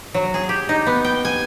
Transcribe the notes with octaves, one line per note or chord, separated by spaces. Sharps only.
F#3
G#4
G4
D#4
B3
G5
G#5